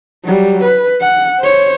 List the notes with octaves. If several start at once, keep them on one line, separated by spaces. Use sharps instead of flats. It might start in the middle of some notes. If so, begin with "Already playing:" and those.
F#3 G3
B4
F#5
C5 C#5